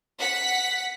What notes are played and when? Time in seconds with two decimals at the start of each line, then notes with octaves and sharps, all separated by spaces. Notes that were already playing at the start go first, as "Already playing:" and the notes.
0.19 F#5 B6